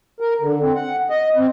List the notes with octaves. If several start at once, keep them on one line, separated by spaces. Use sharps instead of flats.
A#4
D3
C4
F#5
D#5
C4